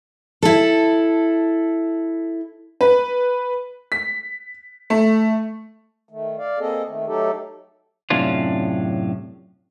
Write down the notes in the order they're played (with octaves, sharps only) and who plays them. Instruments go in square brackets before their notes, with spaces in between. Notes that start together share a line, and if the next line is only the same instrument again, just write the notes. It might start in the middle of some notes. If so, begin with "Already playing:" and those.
[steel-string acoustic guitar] E4 A4
[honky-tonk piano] B4
B6
A3
[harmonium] D#3 A3
D5 F5
A#3 C4 G#4 A4 D#5
D#3 A3
F#3 A3 D#4 G4 A4
[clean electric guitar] F#2 A2 C3 C#4 D4 F4